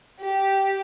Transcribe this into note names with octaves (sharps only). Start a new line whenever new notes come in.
G4